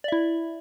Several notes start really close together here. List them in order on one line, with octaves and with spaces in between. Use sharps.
D5 E5 E4